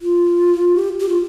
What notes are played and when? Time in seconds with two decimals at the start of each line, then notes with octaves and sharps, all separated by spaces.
0.02 F4
0.76 G4
1.00 G4
1.09 F4